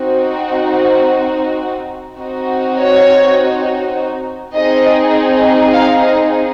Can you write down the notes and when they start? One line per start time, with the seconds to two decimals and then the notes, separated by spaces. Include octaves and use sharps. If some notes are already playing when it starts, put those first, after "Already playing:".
Already playing: C4 D#4 F#4
2.19 C4 D#4 F#4
2.79 C#5
4.55 C4 D#4 G#4 D#5
5.74 F5
6.04 D#5